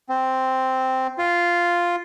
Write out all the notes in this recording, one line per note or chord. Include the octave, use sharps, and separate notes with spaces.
C4
F4